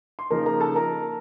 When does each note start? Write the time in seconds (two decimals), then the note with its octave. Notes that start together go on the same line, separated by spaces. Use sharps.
0.19 C6
0.30 C#3 F3 A#3 D#4 A#4 A#5
0.46 A#4 A#5
0.60 A4 A5
0.75 A#4 A#5